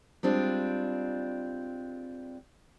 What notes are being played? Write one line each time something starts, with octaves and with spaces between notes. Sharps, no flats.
G3 G#3 C4 D4 F4